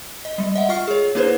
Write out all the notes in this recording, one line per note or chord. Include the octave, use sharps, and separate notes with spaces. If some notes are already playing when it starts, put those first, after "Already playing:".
D#5
G3 G#3
D#5 E5 F#5
F4 F#5 C#6 F6 C7
G#4 C#5
A#3 D4 E4 G#4 B4 C5